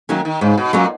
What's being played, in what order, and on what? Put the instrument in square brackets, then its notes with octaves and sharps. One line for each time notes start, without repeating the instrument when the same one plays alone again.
[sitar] D#3 [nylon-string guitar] F#3 A#3 C#4
[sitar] D#3
[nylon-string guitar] G#2 [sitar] C#3
[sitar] B2
[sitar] A#2 [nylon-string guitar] F#3 A#3 C#4